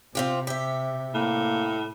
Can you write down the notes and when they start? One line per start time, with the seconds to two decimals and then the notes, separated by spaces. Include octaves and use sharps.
0.15 C3 C4 F4 G4
0.47 G4 E5
1.14 A2 A#3